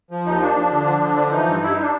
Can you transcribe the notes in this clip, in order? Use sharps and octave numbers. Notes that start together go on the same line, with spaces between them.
F3
D#2 D#4
F3 D4
F3
D3
F3
D3
F3
E3 D#4
G2
G2 E4
D#4
D4